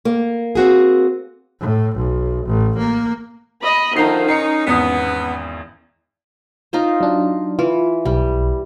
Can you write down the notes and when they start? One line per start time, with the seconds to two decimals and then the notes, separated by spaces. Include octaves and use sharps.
0.05 A#3
0.55 C4 F#4 G#4
1.60 A2
1.96 B1
2.47 A1
2.78 A#3
3.62 D#5 B5
3.97 D3 D#3 F3 D#4 E4 A#5 C7
4.29 C#4 D#4 C7 C#7
4.67 G#1 E2 B3 D#6
6.73 D#4 F4 C5
7.01 F#3 D4
7.59 E3 F4
8.05 B1 G3